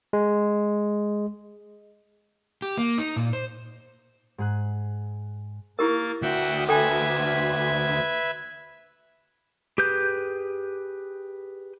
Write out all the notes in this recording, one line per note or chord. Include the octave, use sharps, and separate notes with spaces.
G#3
G4
A#3
D#4
A#2
C5
G#2 G#4 F#6
A#3 E4 G4 A#4 A6
D2 F#4 E5 F#5 G5
A4 B4 E5 G5 G#5 G#6
G4 G#4 B4 G6